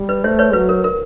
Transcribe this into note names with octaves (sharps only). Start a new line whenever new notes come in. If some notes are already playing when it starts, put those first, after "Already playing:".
Already playing: G3
B4
A3 C5
B4 C#5
F#3 B4
A#4
A#4